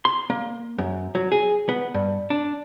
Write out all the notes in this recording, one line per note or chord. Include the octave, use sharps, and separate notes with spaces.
C6
A#3
F#2
F#3
G#4
B3
G2
D4